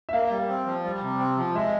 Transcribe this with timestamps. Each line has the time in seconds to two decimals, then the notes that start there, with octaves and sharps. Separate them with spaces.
0.09 E5
0.13 A#3 F5
0.31 G3
0.49 C4
0.66 F3
0.84 G3
1.02 C3
1.19 C4
1.37 F3
1.55 G#3 E5